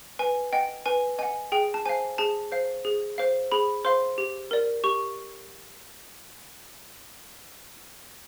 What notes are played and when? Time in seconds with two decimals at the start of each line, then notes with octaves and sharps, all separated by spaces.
0.19 B4 G#5
0.53 D#5 F#5 G5
0.86 B4 G#5
1.18 D#5 F#5 G#5
1.52 G#4 G5
1.74 A5
1.86 C5 F5 G#5
2.18 G#4 A5
2.52 C5 F5
2.85 G#4
3.18 C5 F5
3.52 G#4 B5
3.85 C5 F5 C6
4.18 G4
4.51 A#4 D5
4.84 G4 C#6